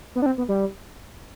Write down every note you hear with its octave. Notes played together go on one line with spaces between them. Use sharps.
B3
D4
C4
B3
G3